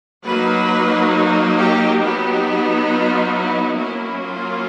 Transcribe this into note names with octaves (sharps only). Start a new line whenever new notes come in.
F#3 A#3 D#4 B4
G4
F#3 B3 D#4 G4
F4
E4
F#3 A#3 C#4 E4
F4